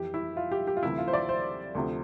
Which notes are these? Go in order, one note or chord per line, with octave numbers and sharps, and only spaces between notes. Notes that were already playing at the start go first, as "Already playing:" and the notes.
Already playing: F2 E3 G4
E4
F4
G4
G4
F4
D2 C3 E3 E4
F4
C5
D5
C5
D2 C3 F3